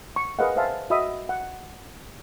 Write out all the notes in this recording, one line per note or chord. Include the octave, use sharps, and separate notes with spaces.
C#6
G#4 A#4 B4 D#5 F5 F#5
B4 C5 E5 F5 G#5 A5
F#4 D#5 E5 B5 D#6
F#5